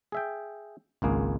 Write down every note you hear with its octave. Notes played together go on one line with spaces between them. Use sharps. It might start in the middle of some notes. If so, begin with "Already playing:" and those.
G#4 E5 G5
G#1 C#2 A#3 G#4